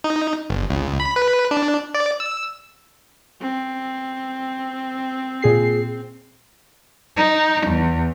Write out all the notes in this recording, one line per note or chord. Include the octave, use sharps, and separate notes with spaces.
D#4
G1
C#2
B5
B4
D4
D5
E6
C4
A#2 G#4 C7
D#4
E2